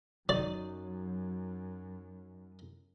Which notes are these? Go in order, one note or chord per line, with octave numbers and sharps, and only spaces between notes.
F#2 F#3 D#4 D5